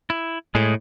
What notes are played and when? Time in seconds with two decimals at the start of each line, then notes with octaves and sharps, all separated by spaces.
0.10 E4
0.55 A2 G#3 G#4